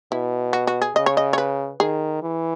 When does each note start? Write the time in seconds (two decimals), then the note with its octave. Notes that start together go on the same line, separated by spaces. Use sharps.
0.12 B2 E4
0.53 F#4
0.67 F#4
0.82 G#4
0.95 C#3 D#5
1.06 C#5
1.17 D#5
1.33 C#5
1.38 B4
1.80 D#3 G#4
2.22 E3